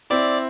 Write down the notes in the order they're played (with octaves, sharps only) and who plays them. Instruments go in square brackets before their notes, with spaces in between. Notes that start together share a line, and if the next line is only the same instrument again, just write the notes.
[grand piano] C4 E4 [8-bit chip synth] D5